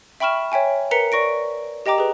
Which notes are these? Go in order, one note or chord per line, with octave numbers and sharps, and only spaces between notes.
E5 G5 B5 C#6 F6 E7
C#5 E5 G5 G#5
A#4 B4 A#5 B6 C#7
D5 C#6 A#6 D7
G4 D#5 G5 A#5 D6
G#4 B4